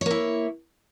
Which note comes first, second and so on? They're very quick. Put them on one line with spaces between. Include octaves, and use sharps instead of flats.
C#5 A#3 E4